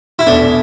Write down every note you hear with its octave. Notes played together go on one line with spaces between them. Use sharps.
E4
E2 B2 A3 D4